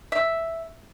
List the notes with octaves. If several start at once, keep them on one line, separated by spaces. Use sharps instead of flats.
E5